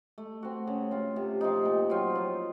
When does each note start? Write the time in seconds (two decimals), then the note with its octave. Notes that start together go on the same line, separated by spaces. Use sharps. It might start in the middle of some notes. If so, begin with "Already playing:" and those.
0.18 A3
0.43 C4 F#4
0.67 C#3
0.91 A3 C4 F4
1.16 C3
1.41 F3 C4 D#4
1.65 A#2
1.90 F#3 C4 F4
2.15 F3